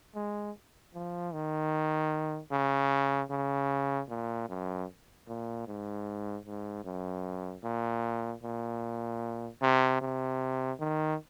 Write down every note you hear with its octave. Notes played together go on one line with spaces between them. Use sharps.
G#3
F3
D#3
C#3
C#3
A#2
F#2
A#2
G#2
G#2
F#2
A#2
A#2
C3
C3
D#3